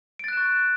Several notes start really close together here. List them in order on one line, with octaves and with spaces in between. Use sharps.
D7 A6 F#6 E7 C#6